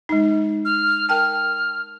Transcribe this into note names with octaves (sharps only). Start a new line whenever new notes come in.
G#3 D#4
F6
A#4 G5 A5 F6